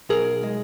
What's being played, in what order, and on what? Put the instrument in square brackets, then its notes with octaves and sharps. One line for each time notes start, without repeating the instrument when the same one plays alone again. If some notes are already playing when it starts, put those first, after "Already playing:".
[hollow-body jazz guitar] B1 G#4 A#4
G#3